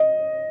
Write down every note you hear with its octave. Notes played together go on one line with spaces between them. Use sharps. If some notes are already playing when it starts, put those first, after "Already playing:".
Already playing: D#5